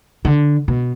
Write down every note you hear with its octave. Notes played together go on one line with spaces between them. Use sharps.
D3
B2